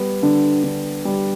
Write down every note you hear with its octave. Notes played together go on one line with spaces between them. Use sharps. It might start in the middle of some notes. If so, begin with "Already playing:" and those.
Already playing: G3 B3
D3
D3
G3